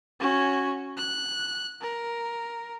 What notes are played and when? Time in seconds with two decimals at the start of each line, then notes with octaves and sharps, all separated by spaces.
0.20 C#4 F#4
0.97 F#6
1.81 A#4